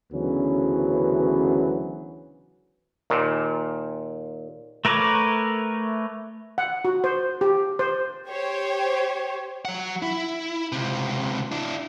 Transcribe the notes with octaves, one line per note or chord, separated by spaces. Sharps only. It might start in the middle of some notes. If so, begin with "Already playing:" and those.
D2 C#3 E3 F#3 B3 C#4
D#2 A#2
A3 A#4 B4 C#5 D6
F#5
F#4
C5
G4
C5
G4 C5 C#5
F#3 F#5
E4
C#2 C3
D4 E4